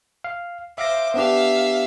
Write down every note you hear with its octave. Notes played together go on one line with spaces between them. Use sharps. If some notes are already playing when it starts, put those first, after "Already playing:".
F5
C5 E5 F5 D6 A#6
B3 D4 G4 E5 F5